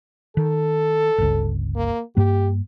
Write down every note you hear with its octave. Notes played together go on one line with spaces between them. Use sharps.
D#3 A4
G1 C#2
A#3
G2 A#3 G4